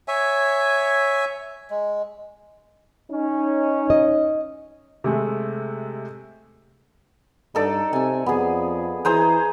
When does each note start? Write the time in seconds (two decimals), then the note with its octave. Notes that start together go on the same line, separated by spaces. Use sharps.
0.08 C#5 E5 G#5
1.70 G#3
3.11 C#4 D#4
3.90 D#5
5.04 C3 G#3 A3
7.55 G2 D#4 A4 D5
7.93 C3 G#5 E6
8.26 F2 B3 G#4
9.05 E3 G#4 C5 A#5